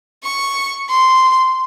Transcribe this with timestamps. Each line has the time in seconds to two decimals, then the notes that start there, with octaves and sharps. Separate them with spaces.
0.23 C#6
0.89 C6